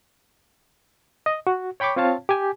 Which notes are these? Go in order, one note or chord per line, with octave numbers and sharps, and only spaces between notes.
D#5
F#4
C#5 G5 B5 C#6 D6
C4 F4 C#5 F5 A5
G4 G#5